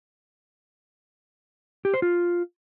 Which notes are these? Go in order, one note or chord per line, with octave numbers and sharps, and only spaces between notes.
G4
C5
F4